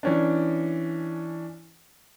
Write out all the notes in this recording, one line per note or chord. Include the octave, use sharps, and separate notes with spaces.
E3 C#4 D4